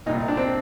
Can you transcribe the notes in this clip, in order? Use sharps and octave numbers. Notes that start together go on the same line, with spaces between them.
C2 A#2 D#4
D4
C4